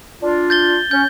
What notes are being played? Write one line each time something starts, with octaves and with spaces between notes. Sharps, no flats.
D4 F4
G6 A6 G7
C#4 G6